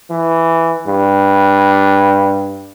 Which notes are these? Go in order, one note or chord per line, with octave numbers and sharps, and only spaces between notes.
E3
G2